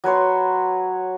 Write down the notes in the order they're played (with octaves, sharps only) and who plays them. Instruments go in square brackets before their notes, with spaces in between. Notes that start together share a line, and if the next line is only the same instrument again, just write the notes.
[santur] F#3 B4 C#5 C6